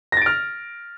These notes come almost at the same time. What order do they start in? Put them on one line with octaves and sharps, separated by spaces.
A#6 A6 D7 F6